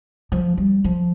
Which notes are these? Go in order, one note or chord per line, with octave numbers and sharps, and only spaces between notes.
F3
G3
F3